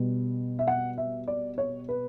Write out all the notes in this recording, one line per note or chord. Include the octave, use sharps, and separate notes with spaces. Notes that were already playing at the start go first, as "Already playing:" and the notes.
Already playing: B2 G3 B3
E5
F#5
E5
D5
C#5
B4